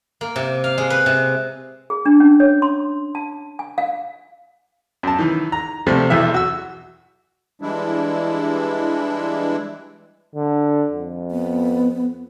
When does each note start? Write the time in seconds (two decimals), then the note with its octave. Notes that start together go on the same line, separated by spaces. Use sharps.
0.21 A#3
0.36 C3
0.64 F5
0.78 G#3
0.90 B4
1.06 C3
1.90 G#4
2.06 D4
2.20 C#4
2.40 C#5
2.62 C6
3.15 A5
3.59 G#5
3.78 F5
5.03 F#2 A5
5.19 D#3 E3
5.52 A#5
5.87 C3 F3 G3 A3 C4
6.10 B1 E2 E3 E5
6.34 F#4 E6
7.61 E3 G3 G#3 D4 E4
10.35 D3
10.92 F2
11.31 B3